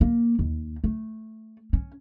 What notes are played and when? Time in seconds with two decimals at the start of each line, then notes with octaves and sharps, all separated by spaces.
0.01 A#3
0.39 D#2
0.84 A3
1.73 C#4